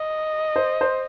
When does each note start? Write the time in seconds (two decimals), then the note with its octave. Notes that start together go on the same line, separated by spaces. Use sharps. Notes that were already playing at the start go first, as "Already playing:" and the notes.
Already playing: D#5
0.56 C5
0.81 C5